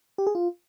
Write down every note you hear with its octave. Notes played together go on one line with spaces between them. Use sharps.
G4
G#4
F4